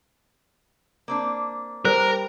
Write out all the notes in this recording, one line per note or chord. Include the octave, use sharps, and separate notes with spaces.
A#3 C4 D4
G3 A#4 C5